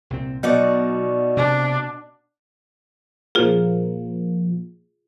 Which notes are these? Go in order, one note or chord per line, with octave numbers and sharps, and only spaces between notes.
C2 A#2 C4
B2 F#3 D#4 F#4 D5
C3 D4
A#2 F3 A#3 F4 G#4